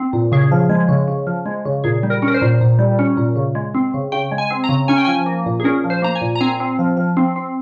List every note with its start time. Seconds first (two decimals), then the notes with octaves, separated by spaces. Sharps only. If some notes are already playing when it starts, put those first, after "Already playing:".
Already playing: C4
0.13 A#2
0.32 C#3 G#4
0.51 F3
0.69 G#3
0.89 C#3
1.08 C#3
1.27 F3
1.46 G#3
1.65 C#3
1.84 A#2 G#4
2.03 G3
2.10 A#4
2.22 C#4
2.28 A#4
2.34 C5
2.42 A#2
2.61 A#2
2.79 G3
2.99 C#4
3.17 A#2
3.36 C#3
3.55 G#3
3.75 C4
3.94 C#3
4.12 C#3 G5
4.31 G#3
4.38 G#5
4.51 C4
4.64 A#5
4.69 C#3
4.88 C#4 G#5
4.98 G5
5.05 F3 G#5
5.26 A#3
5.46 A#2
5.60 G#4
5.64 C#4 A#4
5.84 F3
5.90 C5
6.02 A#3 A#5
6.15 G#5
6.21 A#2
6.35 A#5
6.41 C4 G#5
6.60 C4
6.79 F3
6.97 F3
7.17 C4
7.36 C4